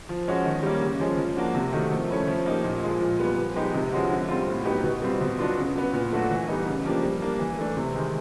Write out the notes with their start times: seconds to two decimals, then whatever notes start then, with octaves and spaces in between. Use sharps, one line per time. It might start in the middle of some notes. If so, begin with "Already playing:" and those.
0.09 F3
0.28 G#3 C#4 F#4
0.45 D#3
0.63 G3 A#3 C#4
0.83 C#3
1.00 F3 G#3 C#4
1.18 F3
1.37 A#3 D4 F#4
1.55 C3
1.73 D#3 F#3 A3
1.92 F3
2.10 A3 C#4 E4
2.28 F3
2.46 A#3 D#4 G4
2.64 A#2
2.83 F3 G#3
3.01 A#2
3.20 G3 B3
3.38 F3
3.56 G#3 B3 D#4 G4
3.74 C3
3.92 F3 G#3 C#4 F#4
4.10 D3
4.29 G3 C4 F4
4.48 A2
4.65 F#3 B3 D#4 G4
4.83 B2
5.02 G3 C4 F4
5.21 B2
5.39 F#3 B3 D4 F4
5.57 C#3
5.76 F#3 B3
5.93 A#2
6.12 F#3 A3 D4 F#4
6.30 E3
6.48 G3 B3 D#4
6.67 C#3
6.85 F3 A#3 D4 G4
7.04 G3
7.22 A#3 D4
7.39 E3
7.59 A3 D4
7.77 C3
7.95 D#3 G#3